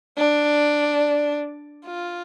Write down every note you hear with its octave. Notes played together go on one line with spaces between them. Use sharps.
D4
F4